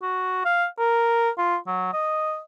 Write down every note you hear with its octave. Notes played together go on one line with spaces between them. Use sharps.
F#4
F5
A#4
F4
F#3
D#5